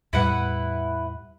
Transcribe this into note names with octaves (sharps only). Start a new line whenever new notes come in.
E2 A2 G3 E4 B4 F#5